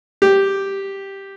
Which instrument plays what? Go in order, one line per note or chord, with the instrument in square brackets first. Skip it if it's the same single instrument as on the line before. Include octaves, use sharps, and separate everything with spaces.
[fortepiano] G4